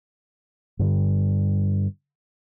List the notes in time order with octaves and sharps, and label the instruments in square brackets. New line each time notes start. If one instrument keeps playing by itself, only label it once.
[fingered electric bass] G2 D3 G3